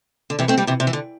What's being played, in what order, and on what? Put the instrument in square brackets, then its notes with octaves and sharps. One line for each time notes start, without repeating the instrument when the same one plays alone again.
[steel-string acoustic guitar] D3
C3 E3
A3 C4
G3 A#3
C3 E3
C3
E3
D3